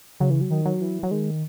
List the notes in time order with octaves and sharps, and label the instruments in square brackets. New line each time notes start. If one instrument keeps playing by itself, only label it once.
[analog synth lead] C#3 [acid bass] F#3
[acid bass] E3
F#3
[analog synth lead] D#3
[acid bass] F#3
[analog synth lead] E3
[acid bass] F#3
[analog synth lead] D#3 [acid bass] G#3